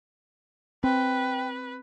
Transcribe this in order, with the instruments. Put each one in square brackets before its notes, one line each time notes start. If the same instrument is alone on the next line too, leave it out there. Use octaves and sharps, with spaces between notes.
[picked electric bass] C4 [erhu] B4 [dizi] G5